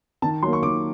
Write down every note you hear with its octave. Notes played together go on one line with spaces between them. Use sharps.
D#3 A5
F#3 A#3 C6
C#6
D#3 D6